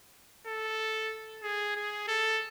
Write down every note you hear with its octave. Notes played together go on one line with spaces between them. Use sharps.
A4
G#4
G#4
A4